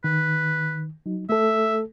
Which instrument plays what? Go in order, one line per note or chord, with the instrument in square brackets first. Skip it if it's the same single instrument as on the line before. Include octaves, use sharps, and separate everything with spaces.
[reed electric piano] D#3 [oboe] B4
[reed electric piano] F#3 D#4
[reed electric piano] A3 A4 [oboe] E5